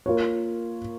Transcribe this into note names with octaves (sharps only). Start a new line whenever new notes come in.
A#3 F4 A#4 C#5